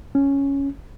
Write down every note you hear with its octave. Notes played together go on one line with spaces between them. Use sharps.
C#4